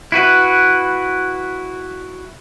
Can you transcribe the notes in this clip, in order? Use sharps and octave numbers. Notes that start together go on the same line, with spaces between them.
E4 F#4 B4